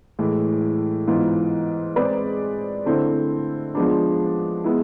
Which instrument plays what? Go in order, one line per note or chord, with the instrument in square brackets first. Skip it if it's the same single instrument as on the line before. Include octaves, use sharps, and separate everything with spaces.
[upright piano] A2 E3 G#3
G#2 E3 B3 F4
G#3 C4 G#4 B4 D5
D3 A3 C4 E4
F3 G#3 B3 D4
G#3 B3 E4